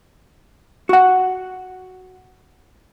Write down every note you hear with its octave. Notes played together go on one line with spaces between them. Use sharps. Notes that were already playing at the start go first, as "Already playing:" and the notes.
F#4 F#5